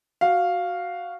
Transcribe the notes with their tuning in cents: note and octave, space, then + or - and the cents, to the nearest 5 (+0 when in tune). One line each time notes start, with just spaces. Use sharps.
F#4 +0 F5 +0